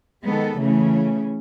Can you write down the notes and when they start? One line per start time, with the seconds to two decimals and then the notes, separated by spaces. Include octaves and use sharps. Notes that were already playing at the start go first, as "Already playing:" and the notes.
0.24 D#3 G#3 B3 A4
0.59 C#3 E3 A3 C#4